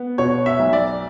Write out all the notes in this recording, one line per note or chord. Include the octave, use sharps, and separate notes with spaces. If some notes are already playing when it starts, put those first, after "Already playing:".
Already playing: B3
B2 C#5
E5
B1
D5